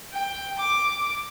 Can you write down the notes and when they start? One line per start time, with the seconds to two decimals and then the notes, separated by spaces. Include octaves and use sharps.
0.12 G5
0.59 D6